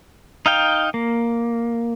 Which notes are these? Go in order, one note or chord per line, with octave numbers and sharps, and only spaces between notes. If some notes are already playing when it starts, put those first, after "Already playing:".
D#4 F5 G5
A#3